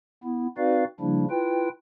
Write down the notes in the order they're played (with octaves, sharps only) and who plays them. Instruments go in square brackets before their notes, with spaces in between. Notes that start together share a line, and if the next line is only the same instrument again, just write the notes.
[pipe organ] B3 E4
C4 D#4 F#4 B4 D5 F5
C#3 F3 G3 A#3 D4 E4
E4 F4 B4 G5